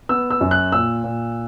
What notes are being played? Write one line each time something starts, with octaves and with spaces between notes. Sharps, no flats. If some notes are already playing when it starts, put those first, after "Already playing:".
B3 E6
E6
F#2
F#6
A#2 E6
A#2